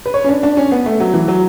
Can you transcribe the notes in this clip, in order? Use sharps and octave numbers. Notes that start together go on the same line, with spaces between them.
B4
C#5
C#4
D4
D4
C#4
B3
A3
F#3
E3
F#3